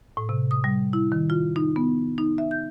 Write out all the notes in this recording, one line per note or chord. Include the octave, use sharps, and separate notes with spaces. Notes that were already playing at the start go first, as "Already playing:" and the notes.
A2
C3
D#6
G3
E4
D#3
F4
D#4
B3
D#4
E5
G6